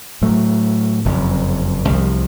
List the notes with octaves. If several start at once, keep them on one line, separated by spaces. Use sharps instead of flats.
A2 F#3 A3
F#1 F2 C3
C2 C3 F3